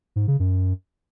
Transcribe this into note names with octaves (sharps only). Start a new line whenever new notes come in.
G#2
C#3
F#2